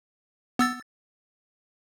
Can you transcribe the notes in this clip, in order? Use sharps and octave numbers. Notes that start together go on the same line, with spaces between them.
B3 E6 A6